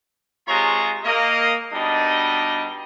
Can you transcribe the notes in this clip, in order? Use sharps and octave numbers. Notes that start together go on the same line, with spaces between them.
C3 G#3 F4 C#5 A#5 C6
A#3 D#5
B2 G3 D4 D#4 D#5